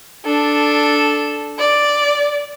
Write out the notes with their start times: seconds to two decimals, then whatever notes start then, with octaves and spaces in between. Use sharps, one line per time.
0.25 D4 A4
1.59 D5